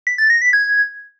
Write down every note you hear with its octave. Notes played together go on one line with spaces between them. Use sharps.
B6
A6
A#6
B6
G#6